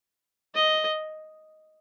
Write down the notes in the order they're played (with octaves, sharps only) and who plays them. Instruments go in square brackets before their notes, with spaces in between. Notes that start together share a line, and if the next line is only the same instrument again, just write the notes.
[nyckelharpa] D#5